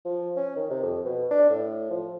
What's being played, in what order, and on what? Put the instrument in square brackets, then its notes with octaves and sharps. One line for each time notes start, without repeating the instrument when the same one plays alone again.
[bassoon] F3
C#4
D#3
C3
F2
B2
D4
A2
F3